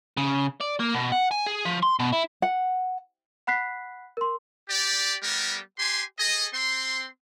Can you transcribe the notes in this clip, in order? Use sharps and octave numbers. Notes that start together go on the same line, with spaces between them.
C#3
D5
A#3
B2
F#5
G#5
G#4
F3
C6
B2
E4
F#5
F#5 B5 F#6 B6 C7
A#4 C6
G4 D5
G3 A3 B3 G4 A#4
G4 G#5 C6
G#4 A4 D#5
C4 C6